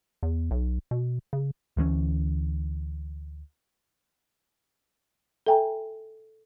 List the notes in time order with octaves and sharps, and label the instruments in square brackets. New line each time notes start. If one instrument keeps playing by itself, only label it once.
[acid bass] E2
B1
B2
C#3
[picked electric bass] D2 E3 G3 C#4
[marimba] A4 E5 G5 G#5 A#5